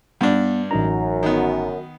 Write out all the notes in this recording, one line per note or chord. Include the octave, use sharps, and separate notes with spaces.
G2 B3 D4
A1 F#2 D#4 A#5
D#3 B3